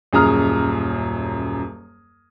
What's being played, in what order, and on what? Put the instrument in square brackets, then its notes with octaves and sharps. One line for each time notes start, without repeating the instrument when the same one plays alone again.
[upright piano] D#1 F#2 G#4 A#5 D#6 F6